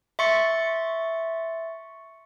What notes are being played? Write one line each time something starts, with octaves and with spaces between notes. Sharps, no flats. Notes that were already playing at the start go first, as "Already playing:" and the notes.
E5 C6 C#6 A6 C#7